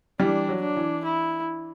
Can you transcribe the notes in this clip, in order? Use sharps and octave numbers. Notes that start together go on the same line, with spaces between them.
E3 G3 D4
F#3
D4
E3
E4